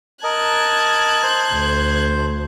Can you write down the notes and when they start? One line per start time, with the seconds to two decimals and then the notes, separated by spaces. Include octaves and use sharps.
0.24 A#4 D#5 A5 F#6 G#6
1.23 C5
1.53 D2